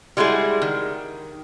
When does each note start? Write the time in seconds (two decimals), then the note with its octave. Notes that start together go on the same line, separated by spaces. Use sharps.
0.17 G3 G#3 E4 F#4 G#4
0.62 D#3